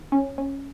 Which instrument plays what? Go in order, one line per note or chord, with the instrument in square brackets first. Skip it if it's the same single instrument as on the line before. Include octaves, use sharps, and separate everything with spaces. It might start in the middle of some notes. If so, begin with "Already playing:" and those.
Already playing: [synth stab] D#3
C#4
C#4